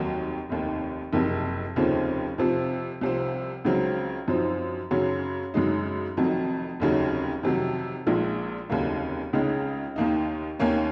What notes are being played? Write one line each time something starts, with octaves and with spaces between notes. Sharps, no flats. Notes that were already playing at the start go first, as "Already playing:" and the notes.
Already playing: F1 D#2 D#3 F#3
F1 D#2 D#3
F#1 F2 C3
F1 D#2 C#3 F3 C4
F2 C3 F3 C4
C2 C3 F3 C4
C#2 C#3 F#3 C4
F#2 F3 C4 D#4
F#2 C#3 F#3 C#4
F#2 C#3 G#3 D#4
F1 F2 D#3 F#3
F1 D#2 C#3 F#3
F2 C3 D#3 F#3
A#1 A#2 F3 G#3
F1 D#2 C#3 F#3 A#3
C#2 C#3 G#3 D#4
D#2 D#3 A#3 D#4
D#2 D#3 A#3 C#4